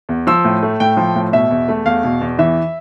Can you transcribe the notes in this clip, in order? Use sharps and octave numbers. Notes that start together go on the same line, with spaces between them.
E2
F3 E6
A2
A3
A2 G5
F3
A2
B2 E5
E2
A3
E2 F5
B2
E2
E3 E5